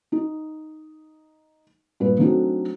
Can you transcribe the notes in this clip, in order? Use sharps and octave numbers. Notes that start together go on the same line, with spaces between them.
D#4
G2 A#2 B4
F#3 A3 C4 D4 D#4 F#4